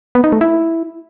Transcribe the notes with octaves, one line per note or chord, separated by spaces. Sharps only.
B3
D#4
A3
E4